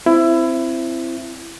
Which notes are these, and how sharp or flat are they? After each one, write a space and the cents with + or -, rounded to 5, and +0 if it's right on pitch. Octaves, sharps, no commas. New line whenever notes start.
C4 +0 E4 +20